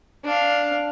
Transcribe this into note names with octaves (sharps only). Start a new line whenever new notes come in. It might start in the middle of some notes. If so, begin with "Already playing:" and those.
D4 F5